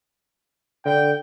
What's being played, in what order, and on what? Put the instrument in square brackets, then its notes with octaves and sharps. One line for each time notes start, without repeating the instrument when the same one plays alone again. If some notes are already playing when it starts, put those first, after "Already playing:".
[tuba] D3 [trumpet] G5